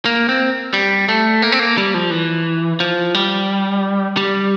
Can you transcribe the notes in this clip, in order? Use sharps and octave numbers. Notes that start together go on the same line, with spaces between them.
A#3
C4
G3
A3
A#3
C4
A#3
G3
F3
E3
F3
G3
G3